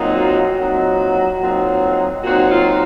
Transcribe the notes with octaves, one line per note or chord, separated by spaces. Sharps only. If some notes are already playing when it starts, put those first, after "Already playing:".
Already playing: A#2 F#3 C4 D#4
F#4
A#2 F#3 C4 D#4
A#2 F#3 C4 D#4
A#2 F#3 C4 D#4 F#4
F4